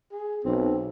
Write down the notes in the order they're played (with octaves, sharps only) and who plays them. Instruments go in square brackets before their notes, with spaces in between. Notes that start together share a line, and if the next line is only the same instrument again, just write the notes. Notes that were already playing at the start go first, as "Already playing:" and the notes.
[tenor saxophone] G#4
[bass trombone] B1 [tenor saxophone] C4